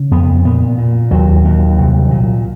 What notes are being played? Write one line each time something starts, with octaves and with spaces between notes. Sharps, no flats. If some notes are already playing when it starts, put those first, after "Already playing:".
Already playing: C#3
F2 B3
A#2 B3
A#2
D#2 F#3
D#2
C2
A#2